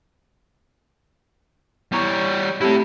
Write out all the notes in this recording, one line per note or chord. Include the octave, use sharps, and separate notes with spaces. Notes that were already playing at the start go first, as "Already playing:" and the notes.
G3 B3 E4 C#5 A#5
A3 C4 E4 G4 A4